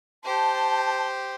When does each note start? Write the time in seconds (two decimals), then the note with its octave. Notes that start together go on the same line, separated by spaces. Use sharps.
0.24 G4 C5 A5